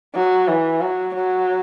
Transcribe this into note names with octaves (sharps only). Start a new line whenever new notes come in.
F#3
E3
F#3
F#3